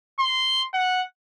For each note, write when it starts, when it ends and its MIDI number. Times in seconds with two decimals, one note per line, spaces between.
0.19 0.62 84
0.74 1.02 78